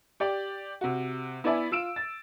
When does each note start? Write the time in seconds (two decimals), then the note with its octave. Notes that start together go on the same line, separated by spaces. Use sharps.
0.20 G4 D5 G5
0.81 C3 F#4
1.44 B3 E4 B4 D5 E5 G#5
1.71 F4 E6 D7 E7
1.96 A6